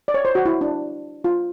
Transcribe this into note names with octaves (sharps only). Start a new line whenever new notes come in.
D5
C#5
C5
F#4
E4
D4
F4